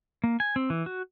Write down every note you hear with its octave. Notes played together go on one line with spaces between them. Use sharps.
A#3
G#5
C4
E3
F#4